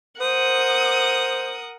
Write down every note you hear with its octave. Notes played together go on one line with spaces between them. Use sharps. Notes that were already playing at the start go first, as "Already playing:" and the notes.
A#4 C5 F#5 D#6